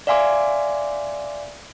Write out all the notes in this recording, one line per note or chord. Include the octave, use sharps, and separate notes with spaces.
D5 E5 F5 G#5 C6 D6